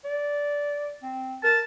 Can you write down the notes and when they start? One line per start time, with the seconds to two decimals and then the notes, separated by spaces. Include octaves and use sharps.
0.05 D5
1.03 C4
1.44 A#4 A5